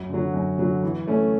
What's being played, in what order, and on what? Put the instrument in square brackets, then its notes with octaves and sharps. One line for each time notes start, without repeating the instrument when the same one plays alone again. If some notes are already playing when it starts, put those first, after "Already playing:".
Already playing: [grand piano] F#2
D3 F#3
F#2
D3 F#3
E3
A3 C#4